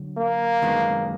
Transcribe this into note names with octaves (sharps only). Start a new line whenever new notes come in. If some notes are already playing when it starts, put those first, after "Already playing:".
Already playing: D3 F#3
A#3
F#2 D#3 G#3 B3